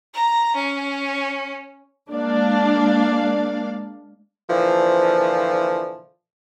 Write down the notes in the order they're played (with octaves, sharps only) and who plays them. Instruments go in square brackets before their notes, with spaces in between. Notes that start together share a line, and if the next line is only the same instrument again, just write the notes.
[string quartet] A#5
C#4
[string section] G#3 A#3 D4 D5 F5
[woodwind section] A#2 D3 E3 F3